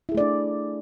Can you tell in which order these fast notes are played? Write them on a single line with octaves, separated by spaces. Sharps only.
E4 G#4 A3 D5 D4